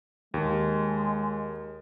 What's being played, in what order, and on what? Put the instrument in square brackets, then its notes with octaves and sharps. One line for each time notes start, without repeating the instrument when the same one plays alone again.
[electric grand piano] D#2 [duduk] G#3